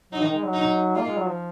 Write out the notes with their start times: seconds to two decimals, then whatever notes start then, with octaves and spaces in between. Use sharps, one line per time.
0.12 F#3 D#4
0.23 D#3
0.33 G#3
0.44 F#3
0.53 D#4
0.95 A#3 F4
1.07 G#3
1.17 F#3
1.27 F3